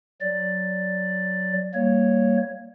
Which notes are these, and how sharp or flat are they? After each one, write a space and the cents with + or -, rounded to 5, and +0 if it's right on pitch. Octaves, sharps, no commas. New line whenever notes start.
F#3 +0 D5 +0
G3 +0 A#3 +0 C#5 +0